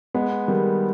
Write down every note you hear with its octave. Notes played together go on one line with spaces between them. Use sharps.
G#3 B3
D#3 G3